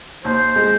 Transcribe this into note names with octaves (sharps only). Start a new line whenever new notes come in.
D#2 C5
G#3